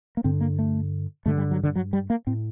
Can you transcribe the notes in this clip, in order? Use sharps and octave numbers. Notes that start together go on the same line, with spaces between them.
A#3
G2 D3 C4
A#3
A3
G2 D3 A3
G3
F#3
D3
F#3
G3
A#3
A2 C4